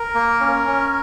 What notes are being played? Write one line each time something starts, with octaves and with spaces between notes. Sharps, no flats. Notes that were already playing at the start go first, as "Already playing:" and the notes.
Already playing: A#4
A#3
C#4
C#4